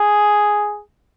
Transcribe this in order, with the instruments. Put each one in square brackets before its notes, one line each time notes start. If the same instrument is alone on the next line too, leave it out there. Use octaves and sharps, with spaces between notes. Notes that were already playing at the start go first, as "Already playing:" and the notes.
Already playing: [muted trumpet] G#4